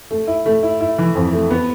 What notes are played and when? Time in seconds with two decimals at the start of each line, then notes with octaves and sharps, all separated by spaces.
0.11 A3
0.27 E4
0.46 A3
0.63 E4
0.81 E4
0.98 E3
1.15 F2
1.33 A3
1.51 B3